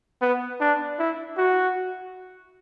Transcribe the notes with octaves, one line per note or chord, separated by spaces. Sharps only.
B3
D4
E4
F#4